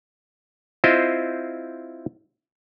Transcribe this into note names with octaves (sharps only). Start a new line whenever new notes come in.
C4 E4 F4 C5 D#5